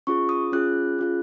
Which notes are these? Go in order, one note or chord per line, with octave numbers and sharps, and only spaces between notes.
C#4 F4 G#4 C#6
D#6
C#4 F4 G#4 F#6
C#4 F4 G#4